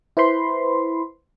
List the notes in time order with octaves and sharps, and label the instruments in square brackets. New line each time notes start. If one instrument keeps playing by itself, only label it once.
[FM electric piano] E4 B4 C5 B5 C6